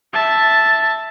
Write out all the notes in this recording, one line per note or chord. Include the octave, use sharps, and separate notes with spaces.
E5 A5